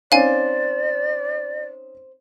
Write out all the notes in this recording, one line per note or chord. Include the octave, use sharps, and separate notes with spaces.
C4 C#4 D#4 C5 D5 F5 G#5